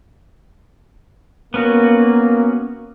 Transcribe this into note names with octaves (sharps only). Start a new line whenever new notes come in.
A#3 B3 C#4 F#4